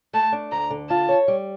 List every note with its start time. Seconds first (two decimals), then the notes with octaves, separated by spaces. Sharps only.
0.14 A3 A5
0.33 D4
0.52 D2 A#5
0.71 D3
0.90 F4 A5
1.09 C#5
1.28 G3